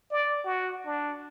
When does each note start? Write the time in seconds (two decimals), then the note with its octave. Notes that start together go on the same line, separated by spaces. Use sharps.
0.11 D5
0.44 F#4
0.85 D4